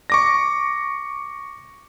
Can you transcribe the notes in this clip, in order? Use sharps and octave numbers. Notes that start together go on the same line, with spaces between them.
C#6 D6 A#6